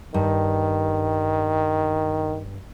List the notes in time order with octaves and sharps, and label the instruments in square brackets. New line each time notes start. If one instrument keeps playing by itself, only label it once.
[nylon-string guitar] G2 [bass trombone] D#3